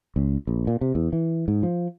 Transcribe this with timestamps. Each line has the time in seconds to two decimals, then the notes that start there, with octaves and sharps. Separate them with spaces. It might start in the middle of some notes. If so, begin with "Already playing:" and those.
0.16 C#2
0.47 A#1
0.67 A#2
0.81 C3
0.95 E2
1.13 E3
1.48 G#2
1.63 F3